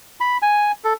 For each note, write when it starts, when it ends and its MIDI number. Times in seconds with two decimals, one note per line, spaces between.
0.20 0.37 83
0.42 0.72 80
0.84 0.93 69